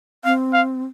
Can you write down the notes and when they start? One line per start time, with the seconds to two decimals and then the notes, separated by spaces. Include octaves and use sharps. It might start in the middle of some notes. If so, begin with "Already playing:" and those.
0.25 C4 F5
0.53 F5